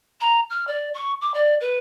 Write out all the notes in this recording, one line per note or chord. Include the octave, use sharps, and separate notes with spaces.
A#5
F6
D5
C#6
D6
D5
B4